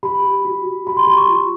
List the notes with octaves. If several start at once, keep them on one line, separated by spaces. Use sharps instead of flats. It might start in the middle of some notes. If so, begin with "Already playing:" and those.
G4 B5
G4
F#4
F#4
G4 B5
C6
G4 C6
C#6
F4